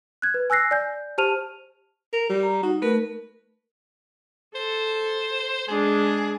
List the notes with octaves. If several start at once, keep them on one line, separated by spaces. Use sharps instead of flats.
F#6 G#6
B4
G#5 E6 F#6 A#6 C7
D5 G#5 G6
G4 C5 A5 F6 D#7 F7
A#4
G3
A#5
D#4 F#4
A3 A#4 B4
A4 C5
G#3 D4 G#4